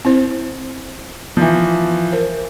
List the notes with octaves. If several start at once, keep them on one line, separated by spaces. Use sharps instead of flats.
C4 E4 C5
E3 F3
A#4 C5